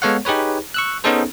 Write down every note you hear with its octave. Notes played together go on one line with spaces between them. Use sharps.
G#3 B3 A4 C#5 F5 F#5
D#4 G4 G#4 B4 C#5
C#6 E6 F#6
B3 C#4 D#4 G#4 A4 C5